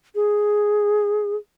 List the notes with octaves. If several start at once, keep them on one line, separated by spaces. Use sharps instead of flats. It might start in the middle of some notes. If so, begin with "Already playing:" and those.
G#4